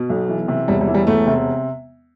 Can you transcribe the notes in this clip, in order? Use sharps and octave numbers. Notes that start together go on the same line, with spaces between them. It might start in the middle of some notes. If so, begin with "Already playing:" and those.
Already playing: B2
B1
E3
C3
E1 G3
G3
E3
G3
E1 A3
C3